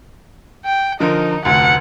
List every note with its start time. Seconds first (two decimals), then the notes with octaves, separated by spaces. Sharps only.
0.66 G5
1.00 D3 F3 D#4 A#4
1.45 F1 D2 F#5